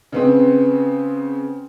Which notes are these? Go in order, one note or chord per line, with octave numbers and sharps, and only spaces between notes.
C#3 B3 C4